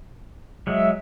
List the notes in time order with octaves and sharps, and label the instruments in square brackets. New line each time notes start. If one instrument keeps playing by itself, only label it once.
[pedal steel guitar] F#3 G#3 [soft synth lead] E5